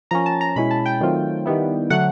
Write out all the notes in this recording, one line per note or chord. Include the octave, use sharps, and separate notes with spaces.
F3 A#3 C#4 A#5
A5
A#5
B2 G#3 C#4 E4 B5
A5
G5
D#3 F#3 A3 C4 F4
D#3 G3 B3 E4
D3 F#3 A3 F#5